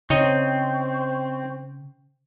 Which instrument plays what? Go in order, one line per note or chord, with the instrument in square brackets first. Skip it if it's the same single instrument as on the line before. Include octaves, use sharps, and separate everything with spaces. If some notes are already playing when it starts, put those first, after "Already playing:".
[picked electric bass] C#3 [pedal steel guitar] C4 [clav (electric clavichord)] D#4 C#5 D#5 [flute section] C5 G5 C#6